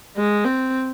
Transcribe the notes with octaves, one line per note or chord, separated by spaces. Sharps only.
G#3
C4